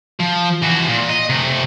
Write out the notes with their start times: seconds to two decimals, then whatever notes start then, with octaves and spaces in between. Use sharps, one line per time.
0.20 F3
0.63 E3 F#4
0.89 A#2
1.09 D#5
1.29 C3 A3